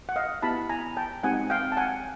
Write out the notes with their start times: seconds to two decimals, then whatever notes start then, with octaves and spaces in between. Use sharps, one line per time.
0.09 F#5
0.16 D#5 F5
0.42 B3 E4 G4 A5 B5
0.69 G#5 A#5
0.97 G5 A5
1.23 G#3 C4 D#4 G4 F#5 G#5
1.50 F5 G5
1.72 A5
1.77 F#5 G#5